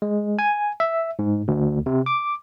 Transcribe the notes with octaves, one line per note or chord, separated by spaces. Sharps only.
G#3
G#5
E5
G#2
D2
C3
D6